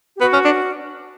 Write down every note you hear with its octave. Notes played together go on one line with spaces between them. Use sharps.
G4
B3 F#4
C#4
D4